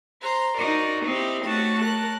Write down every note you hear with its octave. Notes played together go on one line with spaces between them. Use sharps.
C5 A#5
D#4 F#4 A#4 D5
C4 D#4 E4 G4
A3 F#4 C#5 A5
A#4 A5 F#6